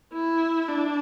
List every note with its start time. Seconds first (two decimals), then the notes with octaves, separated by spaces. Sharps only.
0.13 E4
0.68 D4